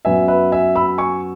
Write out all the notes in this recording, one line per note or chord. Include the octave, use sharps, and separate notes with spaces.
F#2 F#3 B3 E5 G#5
B4 E5
E5 G#5
B5 E6
G#5 C#6